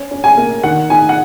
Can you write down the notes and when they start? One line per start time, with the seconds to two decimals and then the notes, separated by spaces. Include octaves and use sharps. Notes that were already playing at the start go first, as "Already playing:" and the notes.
Already playing: C#4
0.11 C#4
0.24 G#5
0.37 A#3
0.63 D#3 F#5
0.90 D#4 G#5
1.09 F#5